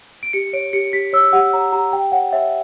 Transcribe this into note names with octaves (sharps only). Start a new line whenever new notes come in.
D7
G4 C#7
C#5 D7
G4 C#7
G4 B6
C#5 E6
G4 F#5
C#5 A#5
G4 A#5
G4 G5
C#5 F#5
C#5 E5